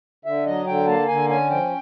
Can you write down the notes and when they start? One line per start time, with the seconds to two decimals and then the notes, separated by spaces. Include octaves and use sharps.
0.25 D3 E5
0.46 F#3 D#5
0.67 D3 G5
0.87 A#3 A5
1.08 D3 G#5
1.29 C#4 G#5
1.50 F3 G5